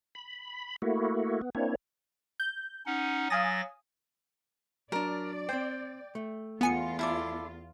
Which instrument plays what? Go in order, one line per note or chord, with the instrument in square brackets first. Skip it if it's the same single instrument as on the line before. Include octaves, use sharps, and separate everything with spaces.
[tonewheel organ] B5
A3 A#3 E4 F#4
B3
A#3 C4 D4 E4 C#5
[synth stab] G6
[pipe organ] C#4 D#4 F#5
[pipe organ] F#3 A6 A#6 [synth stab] F5 G#5 D#6
[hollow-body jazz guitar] F#3 D4 [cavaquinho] A#4 [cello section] D5
[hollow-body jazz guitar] C4 C5 [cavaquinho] G5
[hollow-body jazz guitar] A3
[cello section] E2 F4 [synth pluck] B3 G#5 C#7
[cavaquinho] E4 A4 D5